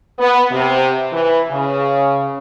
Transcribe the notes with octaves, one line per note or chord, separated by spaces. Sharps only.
B3
C3
E3
C#3